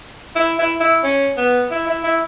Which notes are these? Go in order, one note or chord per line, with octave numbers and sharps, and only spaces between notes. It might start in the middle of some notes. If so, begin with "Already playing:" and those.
E4
E4
E4
C#4
B3
E4
E4
E4